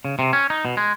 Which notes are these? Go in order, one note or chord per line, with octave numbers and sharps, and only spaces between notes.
C#3
C3
C#4
D#4
B2
G#3